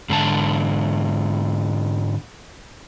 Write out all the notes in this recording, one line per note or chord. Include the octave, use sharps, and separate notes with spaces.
G#2 D3 A5